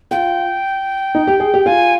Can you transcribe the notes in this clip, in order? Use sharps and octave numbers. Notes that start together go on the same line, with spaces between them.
F4 G5
D#4
G4
G#4
G4
F4 G#5